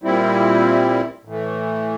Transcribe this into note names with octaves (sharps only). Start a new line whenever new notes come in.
A#2 G3 C4 E4
A2 E3 A3